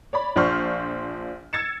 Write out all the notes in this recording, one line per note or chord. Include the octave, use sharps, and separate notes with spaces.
C#5 D5 B5
A#1 F3 D4 C5 C#6 F6
E6 G#6 A6 C#7 E7